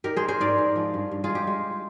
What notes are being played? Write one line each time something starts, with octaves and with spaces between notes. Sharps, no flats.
D#4 G4 A#4
G#4 C5
D#4
G#4 C5
G#2 A#4 D5
G#2
F3
G2
G2
F4 G#4
G#3
G4
G#3